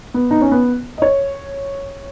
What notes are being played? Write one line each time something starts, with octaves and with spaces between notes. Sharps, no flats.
B3
D#4
C#4
B3
D#5
C#5